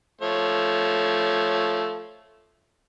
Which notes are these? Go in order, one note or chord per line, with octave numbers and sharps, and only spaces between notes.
F3 A3 C#5